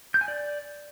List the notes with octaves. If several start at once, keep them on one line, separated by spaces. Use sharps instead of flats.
G6
G#5
D5